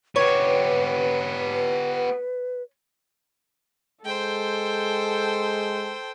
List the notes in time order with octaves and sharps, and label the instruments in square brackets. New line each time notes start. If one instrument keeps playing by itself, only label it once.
[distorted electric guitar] B3 G4 [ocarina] B4 [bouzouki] C#5
[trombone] G#3 [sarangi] A4 [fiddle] C5 G5